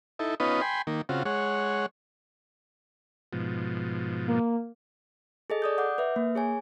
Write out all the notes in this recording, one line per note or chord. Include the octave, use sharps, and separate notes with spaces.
D#4 E4 A4
B3 C#4 D#4 F4 B4 D#5
G5 G#5 B5 C6
D#3 A#3
C#3 C4 F4 F#4
G#3 C#5 F#5
G#2 B2 F3
A#3
G#4 A4 D#5
D5 D#6 G6
F#5 D6 G6
B4 E5
A#3
G#4 C#5 G#5